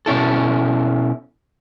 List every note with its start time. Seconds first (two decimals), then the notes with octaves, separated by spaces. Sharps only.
0.06 B2 C#4 E4 A4